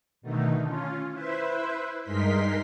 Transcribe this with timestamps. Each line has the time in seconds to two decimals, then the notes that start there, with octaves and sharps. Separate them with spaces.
0.22 B2 D3 D#3 A3 D#4
0.64 C#4 F4
1.12 E4 B4 C5 E5
2.02 G2 G#3 D#4 A#4 C6 B6